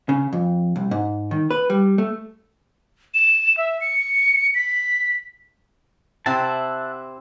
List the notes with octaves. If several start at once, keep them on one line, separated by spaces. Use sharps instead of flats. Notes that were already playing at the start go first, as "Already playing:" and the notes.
C#3
F2
C2
G#2
D#3
B4
G3
A3
E7
E5
C#7
B6
C3 C4 E4 E5 F#5 A5